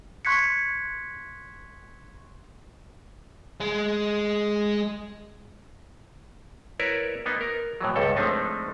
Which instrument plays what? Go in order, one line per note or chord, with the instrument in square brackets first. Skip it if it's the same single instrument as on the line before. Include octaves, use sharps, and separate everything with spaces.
[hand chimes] C6 C#6 F#6 G#6 B6 C#7
[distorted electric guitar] G#3
[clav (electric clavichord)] E4 A#4 B4 C#5 D5 E5
A#3 B3 D#4
A#4
A2 E3 F#3
C#2 G2 G3 A4
F3 G#3 A3 C4 D4 D#4